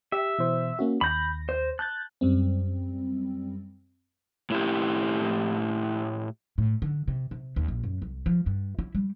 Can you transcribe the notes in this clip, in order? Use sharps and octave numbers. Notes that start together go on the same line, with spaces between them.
G4 E5
B2 E3 C5
A#3 C#4 F#4
D#2 B5 G6 A#6
C5
A5 F#6 G6 A6
F#2 G3 C4
A2 E4 G4
A2
D3
C3
C3
D#2
A#1
F#2
C2
F3
G2
E4
G3